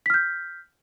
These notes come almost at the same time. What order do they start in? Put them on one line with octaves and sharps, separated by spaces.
B6 F6 G6